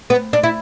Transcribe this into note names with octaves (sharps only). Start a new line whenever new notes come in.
B3
D4
E4